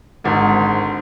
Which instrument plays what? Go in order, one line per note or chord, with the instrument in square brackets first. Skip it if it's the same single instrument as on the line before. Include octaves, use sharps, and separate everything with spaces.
[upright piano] G#1 G#2 [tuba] D3